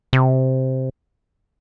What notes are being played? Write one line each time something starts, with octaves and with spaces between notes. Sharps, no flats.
C3